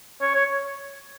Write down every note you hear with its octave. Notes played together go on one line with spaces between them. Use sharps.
C#5
C#5